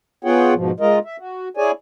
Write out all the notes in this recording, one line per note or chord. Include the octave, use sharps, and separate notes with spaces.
B3 F4 G#4 C#5 F#5 G5
G#2 B2 F3
G#3 F4 A#4 D#5
E5
F#4
E4 G#4 C#5 D5 G#5